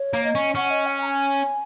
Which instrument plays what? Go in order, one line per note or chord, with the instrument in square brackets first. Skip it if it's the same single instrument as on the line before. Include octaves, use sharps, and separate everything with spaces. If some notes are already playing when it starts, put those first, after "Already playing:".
Already playing: [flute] C#5
[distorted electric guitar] A#3
[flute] D#5
[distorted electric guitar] C#4
[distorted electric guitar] C#4 [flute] F#5
[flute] D#5
G#5
A#5
G#5